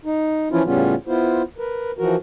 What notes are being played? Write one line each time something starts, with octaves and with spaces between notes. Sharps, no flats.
D#4
E3 F3 C#4 E4 F4
A2 C#3 G3 B3 C#4 F4
B3 E4 F4 C5
A#4 B4
E3 F3 F#4 A#4